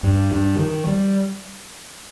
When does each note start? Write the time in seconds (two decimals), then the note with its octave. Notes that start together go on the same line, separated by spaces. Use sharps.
0.03 G2
0.32 G2
0.59 D#3
0.87 G3